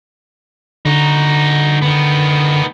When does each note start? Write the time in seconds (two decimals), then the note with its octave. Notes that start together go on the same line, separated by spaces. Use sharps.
0.85 D3 D#4 F#4
1.82 D#3 B3